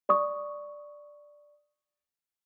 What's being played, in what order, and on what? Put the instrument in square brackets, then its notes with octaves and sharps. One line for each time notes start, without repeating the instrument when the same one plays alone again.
[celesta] D5 C#6 D#6